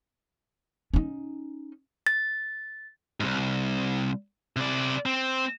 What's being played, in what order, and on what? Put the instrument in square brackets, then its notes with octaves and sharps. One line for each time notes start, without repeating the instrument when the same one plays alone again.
[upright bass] C#4 D#4
[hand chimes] A6
[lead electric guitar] C2 G#2
C3 D5
C4